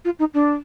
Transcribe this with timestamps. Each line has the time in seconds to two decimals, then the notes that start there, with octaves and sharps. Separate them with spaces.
0.05 F4
0.19 D#4
0.34 D4